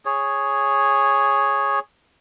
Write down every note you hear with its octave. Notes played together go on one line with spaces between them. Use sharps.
G#4 C#5